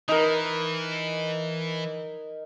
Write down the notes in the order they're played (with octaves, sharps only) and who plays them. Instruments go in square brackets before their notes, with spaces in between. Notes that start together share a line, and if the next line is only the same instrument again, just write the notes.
[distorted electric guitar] E3 [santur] D#4 A#4